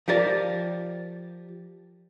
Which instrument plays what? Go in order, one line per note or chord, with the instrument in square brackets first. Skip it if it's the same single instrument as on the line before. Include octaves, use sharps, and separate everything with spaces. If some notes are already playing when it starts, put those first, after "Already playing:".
[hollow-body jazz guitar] F3 G4 A#4 D5